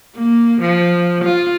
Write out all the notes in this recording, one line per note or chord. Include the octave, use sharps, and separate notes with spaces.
A#3
F3
F4